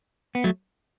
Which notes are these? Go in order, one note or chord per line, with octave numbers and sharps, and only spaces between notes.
B3
F#3 A3